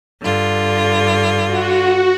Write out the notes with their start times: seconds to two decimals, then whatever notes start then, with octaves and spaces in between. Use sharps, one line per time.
0.21 G2 D3 F4
1.46 F#4